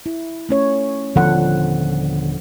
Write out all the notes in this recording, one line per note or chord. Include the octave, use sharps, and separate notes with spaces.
E4
A3 C#4 C#5
D#1 D3 F3 B3 A4 F#5